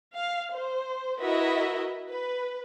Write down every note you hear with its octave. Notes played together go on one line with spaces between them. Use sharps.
F5
C5
E4 F#4 A#4 B4 D#5 E5
B4